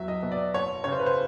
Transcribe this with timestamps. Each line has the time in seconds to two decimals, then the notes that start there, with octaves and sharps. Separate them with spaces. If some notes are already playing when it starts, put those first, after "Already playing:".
Already playing: E2 F#3 E5
0.08 D#5
0.23 B2
0.32 D5
0.54 F#1 C#5
0.84 C#3 C#5
0.92 C5
0.99 B4
1.06 C5